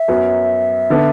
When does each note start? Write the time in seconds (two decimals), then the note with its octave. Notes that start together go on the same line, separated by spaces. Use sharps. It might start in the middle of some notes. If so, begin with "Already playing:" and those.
Already playing: E5
0.08 F#2 F#3 B3 F#4
0.90 D3 B3 D4